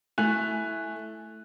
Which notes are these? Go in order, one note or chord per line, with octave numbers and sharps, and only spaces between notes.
A3 E4 G#5 F#6 F7